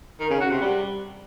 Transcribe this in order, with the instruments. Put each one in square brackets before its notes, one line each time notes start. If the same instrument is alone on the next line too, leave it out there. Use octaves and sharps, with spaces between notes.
[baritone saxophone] D#3
C#3
F#4
C3
G3